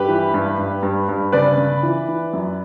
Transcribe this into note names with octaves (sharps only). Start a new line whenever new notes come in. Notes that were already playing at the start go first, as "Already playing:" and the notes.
Already playing: G2 G4 B4
E3
G2
G2
G2
G2
C#3 B4 D5
C#3
E3
E3
F#2